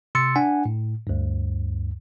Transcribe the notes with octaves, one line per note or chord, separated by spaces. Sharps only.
C3 C6 E6 A6 C#7
D4 F#5 G#5
A2
D2 G2